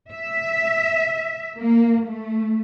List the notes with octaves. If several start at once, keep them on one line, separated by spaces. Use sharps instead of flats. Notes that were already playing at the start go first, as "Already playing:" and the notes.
E5
A#3
A3